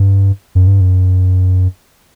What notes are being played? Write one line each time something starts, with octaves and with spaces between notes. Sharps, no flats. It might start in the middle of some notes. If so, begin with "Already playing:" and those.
Already playing: G2
F#2
G2
F#2